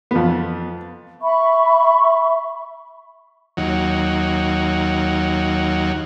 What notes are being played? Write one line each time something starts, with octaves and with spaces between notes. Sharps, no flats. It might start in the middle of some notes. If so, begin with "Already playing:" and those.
F2 B3
E5 B5 C#6
D#2 F#3